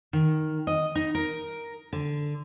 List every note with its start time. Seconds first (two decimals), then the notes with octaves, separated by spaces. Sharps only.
0.13 D#3
0.67 D#5
0.95 D#4
1.15 A#4
1.93 D3